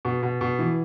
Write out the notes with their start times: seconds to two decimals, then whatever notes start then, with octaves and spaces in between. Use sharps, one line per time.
0.05 B2
0.23 B2
0.41 B2
0.59 E3